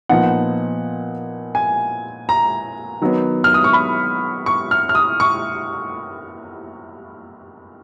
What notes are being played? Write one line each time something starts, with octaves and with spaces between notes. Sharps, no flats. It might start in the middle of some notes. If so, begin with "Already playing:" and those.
A#2 F3 B3 D#4 F#5
G#5
A#5
D#3 F#3 B3
F6
D#6
C#6
B5
C#6
F6
F6
D#6
C#6